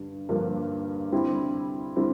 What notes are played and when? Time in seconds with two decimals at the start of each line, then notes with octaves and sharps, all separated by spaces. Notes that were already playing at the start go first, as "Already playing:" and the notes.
Already playing: G2 D3
0.29 G2 D3 F3 A#3 D4
1.12 D3 G3 C4 E4
1.96 D3 G3 C4 E4